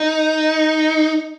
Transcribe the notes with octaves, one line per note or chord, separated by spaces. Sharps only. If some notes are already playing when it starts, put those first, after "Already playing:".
Already playing: D#4